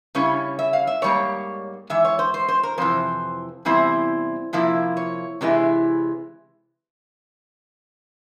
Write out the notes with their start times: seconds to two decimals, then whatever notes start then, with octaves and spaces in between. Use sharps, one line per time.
0.15 C#3 G3 C#4 E4 C#5
0.59 E5
0.73 F5
0.87 E5
1.02 G#2 G3 A#3 C#5
1.90 G#2 E3 E5
2.05 C#5
2.19 C5
2.34 C5
2.48 C5
2.63 A#4
2.78 F2 C3 E3 C5
3.65 E2 C3 G3 C4 E4 C5
4.53 C3 F3 A#3 E4
4.97 C#5
5.41 C3 E3 G#3 C4 E4